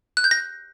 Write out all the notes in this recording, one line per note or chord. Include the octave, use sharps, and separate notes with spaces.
F#6
G6
A#6